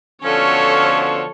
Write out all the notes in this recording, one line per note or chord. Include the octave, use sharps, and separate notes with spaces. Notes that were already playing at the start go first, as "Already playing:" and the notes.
B2 D3 F3 C#4 A4 C#5